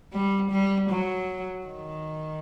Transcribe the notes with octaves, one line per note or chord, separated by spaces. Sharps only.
G3
G3
F#3
D#3